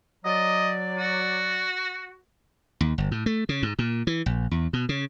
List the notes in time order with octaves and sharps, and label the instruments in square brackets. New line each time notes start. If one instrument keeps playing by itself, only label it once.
[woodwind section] F#3 D5 [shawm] D#5
[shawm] F#4
[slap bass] D#2
G1
A2
A3
C#3
G#2
A#2
E3
A#1
E2
B2
C#3